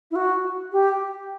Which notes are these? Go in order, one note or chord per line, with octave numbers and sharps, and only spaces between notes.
E4
F#4
G4